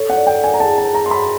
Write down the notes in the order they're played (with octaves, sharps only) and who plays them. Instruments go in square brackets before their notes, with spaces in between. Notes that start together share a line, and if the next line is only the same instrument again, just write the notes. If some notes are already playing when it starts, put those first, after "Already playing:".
Already playing: [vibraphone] A4 [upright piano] C#5
[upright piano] F#5
[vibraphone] D5
[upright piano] G5
[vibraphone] F#5
[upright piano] G#5
A#5
[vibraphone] G#4 [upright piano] A5
[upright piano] A5
[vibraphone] C#5
[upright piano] A#5
[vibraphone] E5 [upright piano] C6
[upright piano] B5